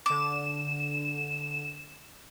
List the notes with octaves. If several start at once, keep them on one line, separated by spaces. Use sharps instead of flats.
D3 D6 E7